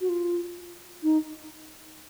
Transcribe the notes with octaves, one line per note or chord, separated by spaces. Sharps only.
F#4
F4
D#4